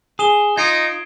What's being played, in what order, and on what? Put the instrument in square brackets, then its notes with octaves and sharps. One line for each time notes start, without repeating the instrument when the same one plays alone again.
[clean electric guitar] G#4 [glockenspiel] D#6 E7 G7
[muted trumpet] D#4 [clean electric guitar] F4 [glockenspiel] G#6 C7 D7